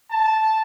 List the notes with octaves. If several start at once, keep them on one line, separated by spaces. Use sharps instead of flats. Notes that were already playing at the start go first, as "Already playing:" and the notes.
A5